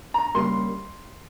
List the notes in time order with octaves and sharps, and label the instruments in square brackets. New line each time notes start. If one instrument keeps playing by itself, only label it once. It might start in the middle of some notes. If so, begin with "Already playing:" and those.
[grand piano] A#5
C#3 G3 A#3 C6